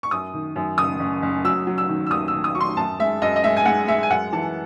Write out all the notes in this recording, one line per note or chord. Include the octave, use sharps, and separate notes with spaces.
C#6
F#2 D#6
D#3
F#2
F#1 D#6
F#1
F#1
F#3 E6
F#3
E6
D#3
E6
D#2 D#6
D#3 E6
D#6
F#3 C#6
C6
F#2 A5
G#3 E5
F#2 D#5
D#5
G#3 E5
G#5
G#3 F#5
G#3 E5
G#5
F#2 F#5
E3 A5